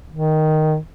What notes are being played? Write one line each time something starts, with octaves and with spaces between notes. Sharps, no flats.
D#3